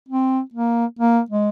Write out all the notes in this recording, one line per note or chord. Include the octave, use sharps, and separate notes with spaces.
C4
A#3
A#3
G#3